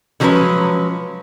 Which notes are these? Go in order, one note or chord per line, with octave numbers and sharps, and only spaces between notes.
D3 F3 F#3 G#3 C#4 B4